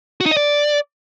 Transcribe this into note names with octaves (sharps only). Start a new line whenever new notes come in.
F#4
D#4
D#5
D5